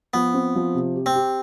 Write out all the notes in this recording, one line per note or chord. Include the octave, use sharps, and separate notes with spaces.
F3 B3
C4
F3
C3
G4
C4
G4